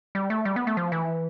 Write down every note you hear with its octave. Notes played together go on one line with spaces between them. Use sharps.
G3
A3
G3
B3
A3
F3
E3